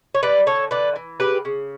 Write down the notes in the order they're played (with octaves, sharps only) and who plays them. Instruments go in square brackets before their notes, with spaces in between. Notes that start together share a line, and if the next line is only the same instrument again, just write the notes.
[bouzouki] C#5
G3 B4 D5
D3 A4 C#5
D3 B4 D5
E3
C#3 G4 B4
C#3